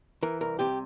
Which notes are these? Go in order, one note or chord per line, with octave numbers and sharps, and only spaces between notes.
E3 A#4
C2 A#4
C3 G4